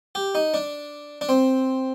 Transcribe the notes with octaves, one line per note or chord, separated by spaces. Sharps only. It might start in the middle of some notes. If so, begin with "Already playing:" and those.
G4
D#4
D4
D4
C4